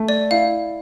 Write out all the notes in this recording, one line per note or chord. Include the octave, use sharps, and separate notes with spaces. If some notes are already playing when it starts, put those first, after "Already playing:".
Already playing: A3
D5
E4 F5